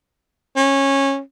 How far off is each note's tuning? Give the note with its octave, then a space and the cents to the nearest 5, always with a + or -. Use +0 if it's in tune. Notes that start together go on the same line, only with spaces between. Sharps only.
C#4 -15